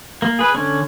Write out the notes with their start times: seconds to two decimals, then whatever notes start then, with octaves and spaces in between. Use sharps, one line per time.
0.22 A#3
0.39 G#4 B4
0.55 D3 C#4